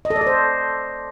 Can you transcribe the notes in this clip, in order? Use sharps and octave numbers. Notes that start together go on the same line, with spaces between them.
D#5
A4
D5
A4
C5